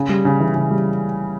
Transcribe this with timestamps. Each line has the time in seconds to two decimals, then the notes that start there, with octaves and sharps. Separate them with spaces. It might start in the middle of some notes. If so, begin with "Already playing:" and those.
Already playing: C#3
0.09 G3
0.25 C#3
0.40 E3
0.55 C#3
0.71 G3